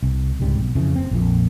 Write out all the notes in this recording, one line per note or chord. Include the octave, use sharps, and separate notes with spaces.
C2
C#2 G#2 C3 G3
B1
F2 C#3 E3
F#1 C4
A#1 F2 A#2